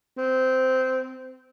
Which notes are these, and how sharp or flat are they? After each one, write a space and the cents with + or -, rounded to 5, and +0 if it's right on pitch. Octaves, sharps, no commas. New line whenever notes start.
C4 -15